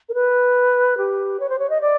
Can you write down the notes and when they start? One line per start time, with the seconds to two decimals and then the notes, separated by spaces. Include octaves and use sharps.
0.09 A#4
0.14 B4
0.98 G4
1.40 C#5
1.49 C5
1.59 C#5
1.70 D#5
1.81 D5